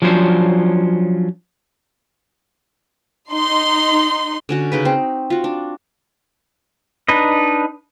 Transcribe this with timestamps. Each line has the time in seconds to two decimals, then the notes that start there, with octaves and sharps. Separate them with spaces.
0.02 F3 F#3 C#4 D4 C5
3.32 D#4 C6
4.49 D3 C#4 F#4
4.72 C#3 D#4 B4
4.85 C4
5.30 F4 F#4
5.44 D4
7.08 D4 D#4 B4 D#5